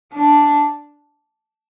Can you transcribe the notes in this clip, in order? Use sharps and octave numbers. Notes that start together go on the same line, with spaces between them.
D4